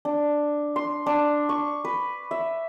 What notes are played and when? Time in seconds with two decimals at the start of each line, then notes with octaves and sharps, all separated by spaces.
0.05 D4
0.76 C6
1.06 D4
1.49 C#6
1.85 B4
2.31 E5